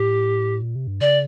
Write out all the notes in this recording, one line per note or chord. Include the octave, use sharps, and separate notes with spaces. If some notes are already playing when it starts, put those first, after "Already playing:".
Already playing: A2 G4
A#2
C3
G2
C#3 D5